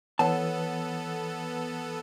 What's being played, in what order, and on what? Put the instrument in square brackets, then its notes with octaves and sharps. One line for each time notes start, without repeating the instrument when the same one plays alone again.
[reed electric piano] E3 B4 [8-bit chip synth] B3 A4 [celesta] C#5 F#5 [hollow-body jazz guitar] A5